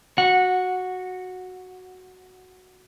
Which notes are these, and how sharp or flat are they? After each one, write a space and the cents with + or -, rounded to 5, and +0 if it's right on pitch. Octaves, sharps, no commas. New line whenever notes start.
F#4 +0 F#5 -15